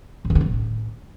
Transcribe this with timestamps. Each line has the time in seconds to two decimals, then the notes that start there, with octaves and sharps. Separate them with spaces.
0.25 F#2
0.30 E2
0.35 D3
0.41 F2
0.46 A2